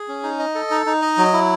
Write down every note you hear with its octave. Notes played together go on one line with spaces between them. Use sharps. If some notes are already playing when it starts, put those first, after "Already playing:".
Already playing: G#4
C#4
D#4
D#5
A4
D#4
D#4
D#5
F#3
E4